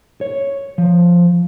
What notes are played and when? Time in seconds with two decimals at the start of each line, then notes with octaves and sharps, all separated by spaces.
0.21 C#5
0.78 F3